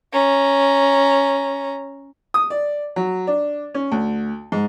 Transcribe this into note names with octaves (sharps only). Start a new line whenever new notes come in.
C#4 A#5
D#6
D5
F#3
D4
C#4
D2
G#2